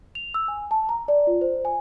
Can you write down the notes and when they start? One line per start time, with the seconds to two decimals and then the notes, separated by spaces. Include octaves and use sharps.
0.15 F7
0.34 E6
0.48 G#5
0.71 A5
0.89 A#5
1.08 D5
1.27 F4
1.41 C5
1.65 G#5